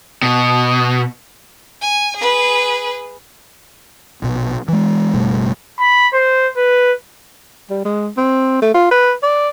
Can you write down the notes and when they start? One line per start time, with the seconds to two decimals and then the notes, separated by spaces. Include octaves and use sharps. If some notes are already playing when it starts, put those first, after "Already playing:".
0.23 B2
1.82 G#5
2.16 G#4 B4
4.22 A#1 B2
4.68 E3 G#3
5.14 F#1 B2 G3 A3
5.80 B5
6.13 C5
6.57 B4
7.70 G3
7.85 G#3
8.17 C4
8.62 A3
8.74 F4
8.91 B4
9.23 D5